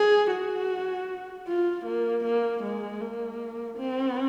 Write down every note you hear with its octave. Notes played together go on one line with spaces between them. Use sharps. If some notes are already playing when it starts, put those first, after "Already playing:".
Already playing: G#4
F#4
F4
A#3
A#3
G#3
A#3
C4